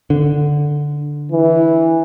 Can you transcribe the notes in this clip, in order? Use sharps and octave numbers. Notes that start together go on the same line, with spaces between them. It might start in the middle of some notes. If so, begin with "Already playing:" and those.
D3
E3